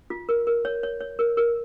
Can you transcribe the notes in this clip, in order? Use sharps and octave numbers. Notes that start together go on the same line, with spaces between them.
F4
A#4
A#4
C#5
C#5
C#5
A#4
A#4